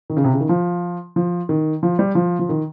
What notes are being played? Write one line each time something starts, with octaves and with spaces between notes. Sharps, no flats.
D#3
C#3
C3
C#3
D#3
F3
F3
D#3
F3
G3
F3
F3
D#3